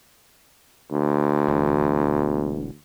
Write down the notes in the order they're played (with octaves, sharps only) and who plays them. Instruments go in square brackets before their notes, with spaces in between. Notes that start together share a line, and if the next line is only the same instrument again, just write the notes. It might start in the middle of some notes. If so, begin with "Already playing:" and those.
[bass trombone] D2
[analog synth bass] E1